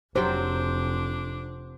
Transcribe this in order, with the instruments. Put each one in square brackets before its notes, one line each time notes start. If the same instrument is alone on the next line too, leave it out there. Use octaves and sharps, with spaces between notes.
[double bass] F1 [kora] C3 F#3 G5 [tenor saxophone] D4 [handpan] C5